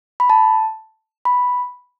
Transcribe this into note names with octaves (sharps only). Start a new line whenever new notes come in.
B5
A5
B5